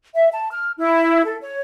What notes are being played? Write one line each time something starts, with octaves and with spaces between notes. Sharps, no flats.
E5
A5
F6
E4
A4
C#5